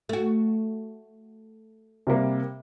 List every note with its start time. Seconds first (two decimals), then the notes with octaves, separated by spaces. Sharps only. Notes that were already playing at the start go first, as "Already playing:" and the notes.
0.09 A3 F#4
2.07 C3 G3 A#3